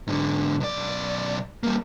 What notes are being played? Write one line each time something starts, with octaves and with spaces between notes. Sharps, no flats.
G#2 D3
B1 D5
G3 A#3